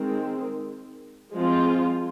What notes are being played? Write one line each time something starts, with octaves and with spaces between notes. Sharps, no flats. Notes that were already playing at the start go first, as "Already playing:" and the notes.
Already playing: D#3 G#3 C4
F3 G#3 C4 F4